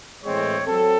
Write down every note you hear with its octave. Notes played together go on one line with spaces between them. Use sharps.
A2 E3 G#3 C4 C#5
F#3 C4 A4